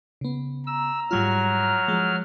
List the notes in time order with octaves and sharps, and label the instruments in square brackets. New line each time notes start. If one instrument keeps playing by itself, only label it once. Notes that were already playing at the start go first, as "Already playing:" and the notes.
[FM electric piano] C#3 B3
[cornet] A#5 [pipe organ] E6
[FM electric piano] G#2 G3 F4 [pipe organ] F#3 F6
[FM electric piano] F3 G#3